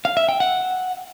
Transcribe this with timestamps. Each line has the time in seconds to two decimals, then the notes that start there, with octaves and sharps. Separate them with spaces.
0.05 F5
0.17 E5
0.29 G5
0.40 F#5